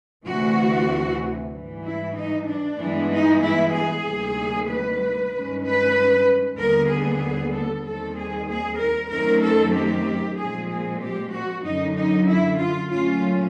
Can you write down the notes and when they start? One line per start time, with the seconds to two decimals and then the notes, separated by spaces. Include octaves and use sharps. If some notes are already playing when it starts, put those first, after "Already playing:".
0.25 D2 C3 E3 F#4
1.52 G#2 E3 G3
1.83 E4
2.15 D#4
2.47 D4
2.78 G2 E3 G#3 B3
3.10 D#4
3.41 E4
3.73 G#4
4.05 D2 C3 D#3 G3 A#3
4.68 B4
5.31 G2 D#3 G#3 C#4
5.62 B4
6.58 D#2 D3 G3 B3 A#4
6.89 G#4
7.53 A4
7.84 D#2 D#3 G3 C4 A4
8.16 G#4
8.47 G#4
8.79 A#4
9.10 F#2 D#3 F#3 A3 C4 A#4
9.42 A4
9.74 G4
10.37 A#2 F3 G#3 C4 G#4
10.69 G#4
11.00 G4
11.32 F#4
11.63 F#2 D3 F#3 D#4
11.95 D#4
12.27 E4
12.59 F4
12.90 A#2 F#3 A3 C#4 F4